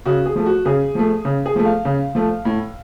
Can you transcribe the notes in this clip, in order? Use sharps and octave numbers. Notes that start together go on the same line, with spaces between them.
C#3 F#4
G#4
F3 A3
F#4
C#3 G#4
F3 A3
C#3
G#4
F3 A3
F5
C#3
F3 A3
A2